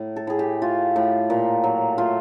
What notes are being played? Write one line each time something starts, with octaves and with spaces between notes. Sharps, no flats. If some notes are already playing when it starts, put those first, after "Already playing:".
Already playing: A2
A4
A2 G#4
G4
A3 F4
A2
A#2
F#3
A3 F4